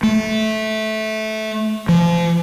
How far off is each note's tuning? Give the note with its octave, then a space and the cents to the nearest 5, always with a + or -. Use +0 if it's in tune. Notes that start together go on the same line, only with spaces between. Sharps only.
A3 -15
F3 -35